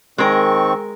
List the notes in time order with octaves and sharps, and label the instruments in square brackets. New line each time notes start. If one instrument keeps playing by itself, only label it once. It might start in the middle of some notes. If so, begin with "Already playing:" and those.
[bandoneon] D#3 C4 C#6 [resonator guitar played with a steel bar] G#3 A#4